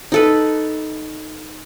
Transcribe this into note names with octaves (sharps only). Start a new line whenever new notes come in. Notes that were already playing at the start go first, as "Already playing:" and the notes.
D#4 A4 B4